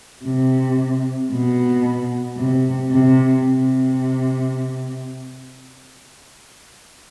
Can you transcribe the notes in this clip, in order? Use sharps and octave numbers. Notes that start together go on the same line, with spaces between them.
C3
B2
C3
C3
C3